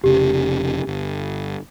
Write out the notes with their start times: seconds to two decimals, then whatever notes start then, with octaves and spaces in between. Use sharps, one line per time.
0.04 F1 C#3 G4
0.87 G1